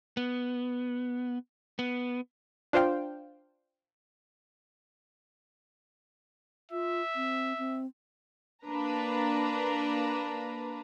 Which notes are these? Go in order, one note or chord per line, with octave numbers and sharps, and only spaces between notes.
B3
B3
D4 F4 C5 F5 G5
F4 E5
C4
C4
A#3 D4 B4 A#5